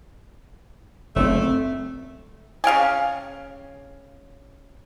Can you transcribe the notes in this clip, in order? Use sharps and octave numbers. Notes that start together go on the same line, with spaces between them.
F#1 A#2 A3 C4
C#3 F5 G5 G#5